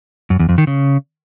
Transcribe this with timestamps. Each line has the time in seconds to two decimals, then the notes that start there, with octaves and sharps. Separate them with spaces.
0.30 F#2
0.39 E2
0.49 F2
0.58 D#3
0.67 C#3